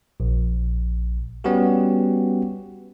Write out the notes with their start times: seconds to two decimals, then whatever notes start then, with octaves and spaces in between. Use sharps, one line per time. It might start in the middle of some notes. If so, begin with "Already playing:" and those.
0.20 A#1
1.44 G3 B3 C#4 F#4 G4